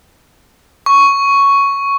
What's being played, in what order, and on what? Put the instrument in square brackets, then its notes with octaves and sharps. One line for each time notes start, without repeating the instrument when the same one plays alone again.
[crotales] C#6